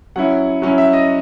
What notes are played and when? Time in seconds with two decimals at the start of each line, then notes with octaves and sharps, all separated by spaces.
0.16 F#3 C#4 E4 F#5
0.62 F#3 C#4 E4
0.78 E5
0.93 D#5